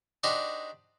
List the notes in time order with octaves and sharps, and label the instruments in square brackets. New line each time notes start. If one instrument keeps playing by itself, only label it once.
[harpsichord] D4 D#4 F#4 G4 C5